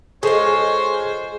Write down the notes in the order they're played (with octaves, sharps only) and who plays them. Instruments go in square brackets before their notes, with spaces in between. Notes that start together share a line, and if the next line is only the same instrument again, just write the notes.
[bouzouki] G#3 F4 [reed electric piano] G#4 A4 [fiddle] C5 [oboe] C#5